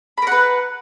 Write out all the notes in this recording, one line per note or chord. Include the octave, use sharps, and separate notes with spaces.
A#4 B4 F#5 B5